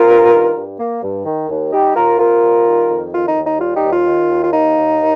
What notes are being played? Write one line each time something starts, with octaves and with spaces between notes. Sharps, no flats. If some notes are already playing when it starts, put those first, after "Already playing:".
Already playing: C4 F4 A#4
G2
D#3
G2
A#3
G2
D#3
D#2
G3 D#4 G4
D#2 F4 A#4
C3 F4 A#4
G3
D#3
F2
D#3 F4
D#4
D#2
D#4
G3 F4
D#4 G4
D#2
F4
D#3
D#2
F4
A#3 D#4
D#2
D#3